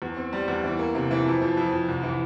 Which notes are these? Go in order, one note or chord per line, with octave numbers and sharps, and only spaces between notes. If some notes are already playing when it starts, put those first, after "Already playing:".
E2
C4
G3
E2
E3
A#3
C3
E3
F2
F3
F2
F2
C2
E3